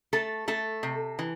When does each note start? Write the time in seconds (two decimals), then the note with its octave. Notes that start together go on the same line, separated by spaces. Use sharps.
0.13 A3 A4
0.48 A3 A4
0.83 C3
1.19 E3